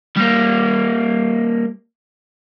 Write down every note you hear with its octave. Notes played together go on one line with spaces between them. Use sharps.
G3 A#3